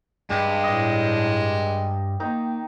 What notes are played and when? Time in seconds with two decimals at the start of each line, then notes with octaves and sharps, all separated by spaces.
0.30 G2 G#3 G4
0.64 A2 D#5
2.20 D#3 A#3 D#4 A#5